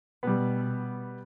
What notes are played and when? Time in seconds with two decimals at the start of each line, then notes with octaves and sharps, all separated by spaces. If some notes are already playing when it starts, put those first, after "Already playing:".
0.23 B2 G3 B3